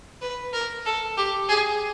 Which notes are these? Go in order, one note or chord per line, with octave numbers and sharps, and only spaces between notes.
B4
A#4
A4
G4
G#4